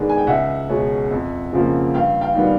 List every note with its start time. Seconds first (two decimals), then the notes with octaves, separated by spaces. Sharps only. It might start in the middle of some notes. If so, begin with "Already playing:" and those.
Already playing: G#2 D#3 G#3 B3 D4
0.09 G#5
0.18 G5
0.27 C#2 E5 F#5
0.70 B2 G#3 C#4
1.11 F2
1.53 C#3 F3 A#3
1.94 G2 F5 G5
2.21 F5 G5
2.35 D#3 G3 B3 D4